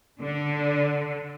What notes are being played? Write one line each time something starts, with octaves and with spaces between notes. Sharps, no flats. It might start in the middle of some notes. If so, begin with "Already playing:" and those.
D3